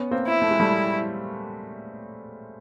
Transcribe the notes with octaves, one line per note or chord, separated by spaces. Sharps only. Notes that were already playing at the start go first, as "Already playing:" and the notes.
Already playing: B3 C#4
A#3 C4
E4
A3
G#3
G3 A3